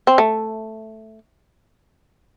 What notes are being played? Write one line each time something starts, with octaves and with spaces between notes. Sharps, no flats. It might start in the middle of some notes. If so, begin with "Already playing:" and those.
C4
A3